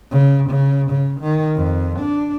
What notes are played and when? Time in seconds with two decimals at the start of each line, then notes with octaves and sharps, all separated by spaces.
0.11 C#3
0.49 C#3
0.90 C#3
1.20 D#3
1.56 F2
1.99 D4